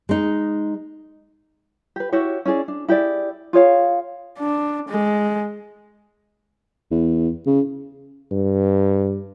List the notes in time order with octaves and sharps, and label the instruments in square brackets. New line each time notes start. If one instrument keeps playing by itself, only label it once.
[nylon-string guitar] G#3 D#4
[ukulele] G4 B4
E4 F#4 G4 C#5
C#4 E4 G#4 D5
D4
E4 G4 G#4 D5
F4 G#4 C#5 F5
[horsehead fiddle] D4
G#3
[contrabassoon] E2
C#3
[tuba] G2